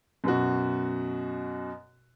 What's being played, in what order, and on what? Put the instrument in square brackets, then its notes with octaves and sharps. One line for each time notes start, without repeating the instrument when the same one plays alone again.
[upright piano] F#2 B2 F#4